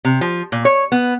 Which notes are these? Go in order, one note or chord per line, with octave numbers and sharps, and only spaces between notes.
C3
F3
A#2
C#5
B3